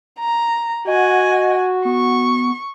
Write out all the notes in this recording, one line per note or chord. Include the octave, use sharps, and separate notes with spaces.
A#5
F#4 D#5 F#5 G#5
B3 C#6